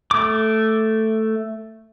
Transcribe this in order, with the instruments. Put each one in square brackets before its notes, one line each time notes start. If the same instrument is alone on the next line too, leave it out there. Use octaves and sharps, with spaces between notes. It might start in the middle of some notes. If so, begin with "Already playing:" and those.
[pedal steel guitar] A3 D6